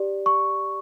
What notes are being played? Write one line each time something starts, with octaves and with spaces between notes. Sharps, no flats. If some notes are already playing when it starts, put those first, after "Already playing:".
Already playing: G4 D5
C#6